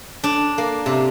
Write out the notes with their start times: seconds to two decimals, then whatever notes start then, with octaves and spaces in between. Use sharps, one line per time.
0.24 D4
0.58 A#3
0.86 C3